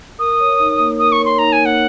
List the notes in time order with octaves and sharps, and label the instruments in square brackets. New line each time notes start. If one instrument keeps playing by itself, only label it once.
[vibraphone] A#4 [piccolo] D#6
[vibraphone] C#5
D#4
A#3
[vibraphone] A#4 [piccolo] D#6
[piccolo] C#6
[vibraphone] C#5
[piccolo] C6
[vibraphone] D#4 [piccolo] A#5
[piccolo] G#5
[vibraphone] A#3
[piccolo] F#5